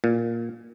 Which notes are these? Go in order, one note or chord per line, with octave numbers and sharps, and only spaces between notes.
A#2